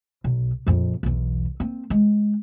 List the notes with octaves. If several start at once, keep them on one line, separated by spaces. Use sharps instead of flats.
B1
A#1 F2
B1 E2
A#3 C4
G#3